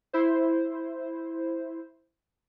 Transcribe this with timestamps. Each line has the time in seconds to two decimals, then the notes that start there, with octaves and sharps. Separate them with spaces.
0.13 E4 C5